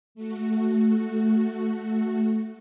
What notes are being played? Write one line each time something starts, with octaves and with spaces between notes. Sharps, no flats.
A3 F#4